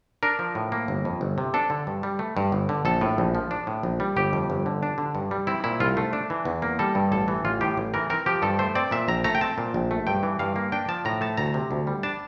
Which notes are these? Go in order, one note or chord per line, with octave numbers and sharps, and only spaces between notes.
D4 A#4
F3
A2
A#3
G1
F2
G1
C3
D4 A4
D3
G2
G3
A3
G2
G1
D3
A#1 A4
A2
A#1
F3
D4
A2
A#1
G3
G1 G4
F2
G1
D3
D4
D3
G2
G3
C4 E4
A#2 E4
C2 F4
A3
D4
E3
E2
A#3
G3 A4
G2
A1 A4
E3
A1 F4
A2 G4
A1
E3 A#4
C4 A#4
F3 G4
G2 A4
A3 C5
C4 D5
A#2 E5
A#1 A#5
A3 A#5
G5
C4 A5
A#2
A#1
A3
G2 G5
E3
G2 F5
A#3
D4 G5
F3 A5
A2 A#5
A3 A5
D2 A#5
C3
D2
G3
D4 A5